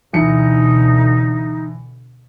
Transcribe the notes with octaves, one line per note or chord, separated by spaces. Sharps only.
D2 B2 E3 D#4 C#7